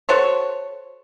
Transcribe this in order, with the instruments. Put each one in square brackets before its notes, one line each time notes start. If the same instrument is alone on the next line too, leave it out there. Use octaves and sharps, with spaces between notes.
[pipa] F#4 A4 C5 C#5